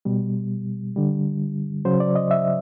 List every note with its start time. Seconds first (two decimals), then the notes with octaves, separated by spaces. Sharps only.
0.05 B2 G3
0.96 D3 G3
1.85 C#3 F#3 C5
2.00 D5
2.15 D#5
2.31 E5